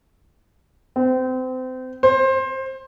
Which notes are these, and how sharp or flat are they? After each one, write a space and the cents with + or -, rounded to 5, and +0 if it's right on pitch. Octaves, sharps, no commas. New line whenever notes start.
C4 -30
C5 +20